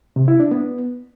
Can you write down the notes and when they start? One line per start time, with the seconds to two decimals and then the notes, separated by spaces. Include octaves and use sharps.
0.16 C3
0.28 E4
0.40 D4
0.51 B3